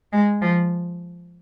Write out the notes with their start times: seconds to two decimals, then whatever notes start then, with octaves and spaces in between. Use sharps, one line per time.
0.13 G#3
0.42 F3